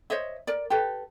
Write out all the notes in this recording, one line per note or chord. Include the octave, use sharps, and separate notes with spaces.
C5 C#5 D#5 E5
A#4 D5
G4 A4 B4